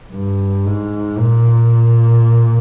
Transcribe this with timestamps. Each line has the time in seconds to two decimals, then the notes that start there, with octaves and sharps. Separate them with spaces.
0.13 G2
0.65 G#2
1.18 A#2